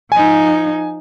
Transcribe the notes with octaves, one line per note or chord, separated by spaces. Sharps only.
F3 D#4 G#5